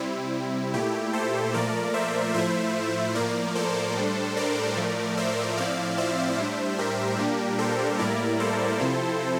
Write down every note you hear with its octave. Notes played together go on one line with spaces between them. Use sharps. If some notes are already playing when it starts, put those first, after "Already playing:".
Already playing: C3 G3 C4 E4
A#2 A3 E4 G4
A4 C5
A#2 F3 A3 A#4 D5
C5 E5
A2 F3 A3 E4 C5 E5
A2 F3 A#3 A#4 D5
A4 C5
A2 G3 D4
A#4 D5
A2 F3 A3
C5 E5
A2 F3 C4 E4 D5 F5
C5 E5
A2 G3 D4
G4 A#4
A#2 G3 A#3 D4
A4 C5
A2 G3 A#3 E4 A#4 D5
A4 C5
C3 F3 C4 E4